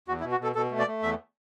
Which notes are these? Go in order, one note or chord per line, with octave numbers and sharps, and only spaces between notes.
E2 F#4
E4
B2
F#4
B2 A4
B2 A4
A3
D5
A3
E2 E5